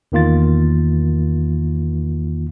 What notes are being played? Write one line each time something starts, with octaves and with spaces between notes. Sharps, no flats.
E2 D#3 A#3 F4 A6